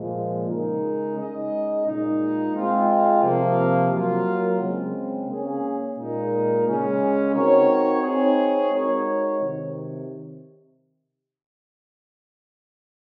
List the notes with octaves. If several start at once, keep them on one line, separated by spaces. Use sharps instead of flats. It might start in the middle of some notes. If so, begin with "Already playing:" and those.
Already playing: A#2 F3 G#3
C#3 G#3 D#4 A#4
C#3 G#3 D#4 G#4 D#5
A#2 G#3 D#4
G#3 C4 F4 C5
C3 F3 A#3 F4
F#3 A#3 F4 A#4
C#3 G#3 C4
A#3 C#4 G#4
A#2 G#3 D#4 A#4
C#3 G#3 C#4 G#4
C4 D#4 F#4 A#4 C#5
C4 D#4 G#4 C#5
G#3 D#4 F#4 A#4 C#5
C3 D#3